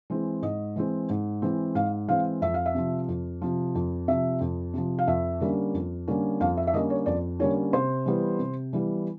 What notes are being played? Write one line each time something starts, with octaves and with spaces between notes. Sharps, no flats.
E3 G#3 C4
G#2 D#5
E3 G#3 C4
G#2
E3 G#3 C4
G#2 F5
E3 G#3 C4 F5
F2 E5
F5
E5
C3 F3
F2
C3 F3
F2
C3 F3 E5
F2
C3 F3
F5
F2 E5
D3 G3 A#3 C#4
F2
D3 G3 A#3 C#4
F2 F5
E5
E5
D3 G3 A#3 C#4 D#5
C#5
F2 D5
D3 G3 A#3 C#4 C#5
C3 C5
E3 G3 B3
C3
E3 G3 B3